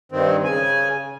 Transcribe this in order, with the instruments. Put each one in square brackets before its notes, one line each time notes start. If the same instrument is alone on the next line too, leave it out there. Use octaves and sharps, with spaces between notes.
[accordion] G2 D#3 C4
C#3 G#5